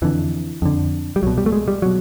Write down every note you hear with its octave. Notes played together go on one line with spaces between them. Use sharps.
F2 D3 E3
F2 D3
G3
C2 B2 F#3
G3
A3
G#3
G3
B2 F#3